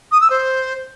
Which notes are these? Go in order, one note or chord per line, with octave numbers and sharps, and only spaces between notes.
D#6
E6
C5